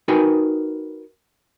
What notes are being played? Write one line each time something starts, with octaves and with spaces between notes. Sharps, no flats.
D#4 F#4 A#4 B4 G5 G#5